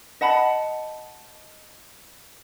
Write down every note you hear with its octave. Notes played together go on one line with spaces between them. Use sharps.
D#5 F#5 A5 B5